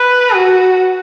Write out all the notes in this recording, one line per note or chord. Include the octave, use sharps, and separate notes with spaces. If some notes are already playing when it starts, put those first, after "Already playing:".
Already playing: B4
F#4